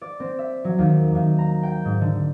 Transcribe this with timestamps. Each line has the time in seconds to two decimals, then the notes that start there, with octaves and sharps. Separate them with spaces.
0.01 D5
0.20 C4
0.39 E5
0.64 F#3
0.79 D#2
1.15 D#2
1.38 A#5
1.63 G5
1.85 G#2
2.01 D3